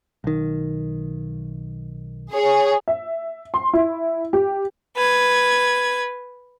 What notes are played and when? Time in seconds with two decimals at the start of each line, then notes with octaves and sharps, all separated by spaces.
0.24 B1 D#3
2.33 G#4 C#5
2.88 E5
3.54 C6
3.73 E4
4.33 G4
4.96 B4 G#6